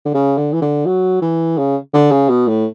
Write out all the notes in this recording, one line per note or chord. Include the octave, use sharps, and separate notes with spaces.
D3
C#3
D3
E3
D3
F#3
E3
C#3
D3
C#3
B2
A2